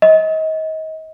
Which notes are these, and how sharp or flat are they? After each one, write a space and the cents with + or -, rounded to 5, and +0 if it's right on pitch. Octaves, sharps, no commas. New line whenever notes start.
D#5 +30